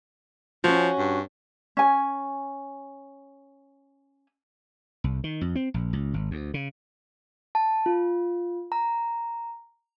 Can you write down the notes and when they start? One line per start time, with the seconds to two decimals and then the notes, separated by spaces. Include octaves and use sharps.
0.64 F3 C#4 F#4
0.98 G2
1.77 C#4 G#5
5.04 C2
5.24 D#3
5.41 F2
5.55 C4
5.74 A#1
5.93 C#2
6.14 G#1
6.31 D2
6.54 C#3
7.55 A5
7.86 F4
8.72 A#5